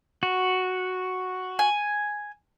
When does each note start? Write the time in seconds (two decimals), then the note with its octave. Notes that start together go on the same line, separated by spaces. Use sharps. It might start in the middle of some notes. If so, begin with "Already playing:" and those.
0.23 F#4
1.59 G#5